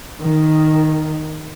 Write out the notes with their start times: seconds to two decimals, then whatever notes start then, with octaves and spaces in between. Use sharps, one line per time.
0.19 D#3